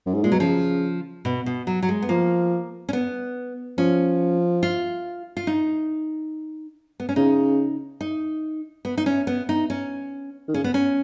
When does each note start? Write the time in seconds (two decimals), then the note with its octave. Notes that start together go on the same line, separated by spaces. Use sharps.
0.06 F#2
0.15 G#2
0.23 A#2 G#3
0.32 B2 F#3
0.40 C#3 F3
1.25 B2
1.46 B2
1.67 F#3
1.83 F#3
1.89 G#3
2.02 B3
2.09 F3 A#3
2.89 C#4
2.93 B3
3.78 F3 C#4
4.63 F4
5.37 F4
5.47 D#4
7.00 B3
7.09 C#4
7.16 C#3 D#4
8.01 D#4
8.85 B3
8.98 D#4
9.06 C#4
9.27 B3
9.49 D#4
9.70 C#4
10.48 D#3
10.54 C#3 C#4
10.64 B3
10.74 C#4